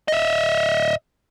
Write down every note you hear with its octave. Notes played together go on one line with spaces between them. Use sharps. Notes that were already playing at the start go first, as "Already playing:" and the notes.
D#5 E5